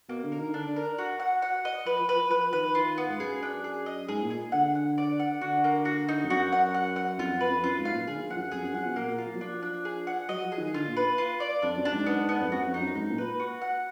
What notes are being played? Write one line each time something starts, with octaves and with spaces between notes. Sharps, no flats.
B2 A#3
D3
A#4
D#3
D3 D4
D3
A#4
F#4
F#5
F#5
D#5
F3 B4
F3
B4
F3
F3 B4
D#3 B4
D#3 F4
B3
G#2
F#2 G#4
D4
G#4
D#5
G#2 G#4
A#2
G#4
D3 F#5
F#5
D5
F#5
D3 F#4
A#3
F#4
D#4
F2
F#2 F#4
F#5
F#5
F#5
F2 F4
F#2
B4
F2
F#2 F4
G#2
F5
A#2
D3 G#4
D#3
F3
F#5
F#2
F2 G#4
F#2
F3 F#5
B2
A#2 A#3
A#2
F4
F3
F#3
F3 D4
D4
G#4
F#5
F#3 D#5
F3
G#4
D#3
D3 F4
A#2
B4
F4
D5
F2 D4
F#2
D4
G#2
B3
B3
F2
F#2 F#4
F2
D#4
F#2
G#2 D#4
A#2
B4
F#4
F#5